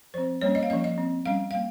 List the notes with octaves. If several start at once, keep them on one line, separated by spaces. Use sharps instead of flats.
F3 C4 C5
G3 A#3 C#4 C#5
D#5
F5
F3 A#3 C#4 D#5
D#5
F3 C4
G3 C#4 F5
G3 A#3 F5